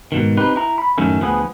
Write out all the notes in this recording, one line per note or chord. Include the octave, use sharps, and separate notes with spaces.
G#2 B2 D#3
C4 D#4 G4 B4
E4 A#5
B5
F#2 A2 D#3 F#3 A3 C#4
D2 F3 B3 G#4